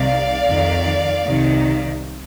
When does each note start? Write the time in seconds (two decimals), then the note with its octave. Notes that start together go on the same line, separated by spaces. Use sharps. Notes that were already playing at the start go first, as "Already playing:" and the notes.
Already playing: C2 C3 D#3 D5 F5
0.46 F2 D#3
1.25 C2 C3 D#3